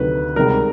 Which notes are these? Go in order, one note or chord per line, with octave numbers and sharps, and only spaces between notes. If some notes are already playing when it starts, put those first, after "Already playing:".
Already playing: D2 C3 D#3 F#3 B4
C#2 C3 D#3 G3 A#4